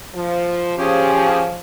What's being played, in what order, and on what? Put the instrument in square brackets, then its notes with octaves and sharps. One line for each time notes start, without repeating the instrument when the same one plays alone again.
[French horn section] F3
[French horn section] F3 [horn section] C#4 G4 G#4